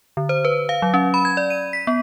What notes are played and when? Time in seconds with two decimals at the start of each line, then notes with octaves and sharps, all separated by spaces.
0.17 D3
0.29 C5
0.45 B4
0.69 F5
0.82 F#3
0.94 C#4
1.14 B5
1.25 G#6
1.37 D5
1.50 D#7
1.73 B6
1.87 B3